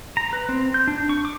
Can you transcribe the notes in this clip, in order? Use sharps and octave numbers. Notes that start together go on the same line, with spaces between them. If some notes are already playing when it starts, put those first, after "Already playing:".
A#5
B4
C4
G6
D4
C#6
D6